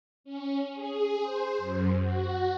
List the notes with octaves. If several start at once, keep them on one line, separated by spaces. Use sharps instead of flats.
C#4
G#4
C5
F#2
F#4